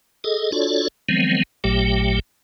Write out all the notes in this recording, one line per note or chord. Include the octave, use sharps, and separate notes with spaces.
G#4 A4 D#5
D4 F4 F#4 A4 C#5 D5
D#3 F3 F#3 G#3 B3 C4
A1 A#2 F#3 A3 G4 G5